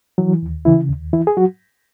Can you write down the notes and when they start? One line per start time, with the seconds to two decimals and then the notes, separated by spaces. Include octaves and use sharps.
0.18 E3 F#3
0.43 D#2
0.65 C#3 E3 E4
0.89 D#2
1.13 E3 E4
1.27 G#4
1.37 F#3 F#4